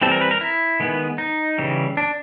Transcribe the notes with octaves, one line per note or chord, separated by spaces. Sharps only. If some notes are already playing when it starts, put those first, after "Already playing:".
E3 G3 C4 A4
A#4
B4
A#4
E4
D#3 G#3 B3
D#4
C#3 E3 G3
D4